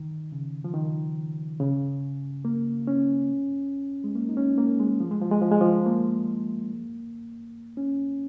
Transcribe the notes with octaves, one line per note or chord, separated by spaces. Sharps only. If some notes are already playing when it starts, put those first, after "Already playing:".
Already playing: D#3
C#3
F3
D#3
C#3
A#3
C#4
G#3
A#3
D#4
C#4
A#3
G#3
F3
G#3
F3
G#3
F3
G#3
F3
A#3
C#4